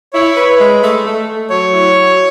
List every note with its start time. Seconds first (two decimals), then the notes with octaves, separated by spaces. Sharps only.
0.13 E4 C#5
0.36 B4
0.58 G#3
0.82 A3
1.05 A3
1.27 A3
1.50 F#3 C#5
1.72 E4
1.95 F#3